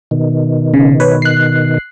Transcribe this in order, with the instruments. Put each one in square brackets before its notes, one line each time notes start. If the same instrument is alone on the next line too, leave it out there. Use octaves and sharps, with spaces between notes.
[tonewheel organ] B2 D#3
[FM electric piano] C#3
B4 C#5
F#6 C7